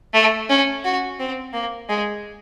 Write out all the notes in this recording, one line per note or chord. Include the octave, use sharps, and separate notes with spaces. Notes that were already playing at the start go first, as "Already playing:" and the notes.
A3
C#4
F#4
C4
A#3
G#3